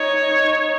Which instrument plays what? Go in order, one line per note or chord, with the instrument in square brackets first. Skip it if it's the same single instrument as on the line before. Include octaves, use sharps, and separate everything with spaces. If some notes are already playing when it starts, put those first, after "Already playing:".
Already playing: [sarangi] D#4 [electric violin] C#5